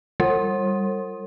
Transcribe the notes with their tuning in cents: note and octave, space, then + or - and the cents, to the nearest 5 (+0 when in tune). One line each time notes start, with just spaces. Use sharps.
G3 +0 A#4 -45